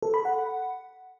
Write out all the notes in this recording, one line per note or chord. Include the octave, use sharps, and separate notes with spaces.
A4
B5
F#5